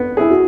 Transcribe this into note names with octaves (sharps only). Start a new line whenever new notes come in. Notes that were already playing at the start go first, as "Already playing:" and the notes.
Already playing: B3
E4 G#4
F#4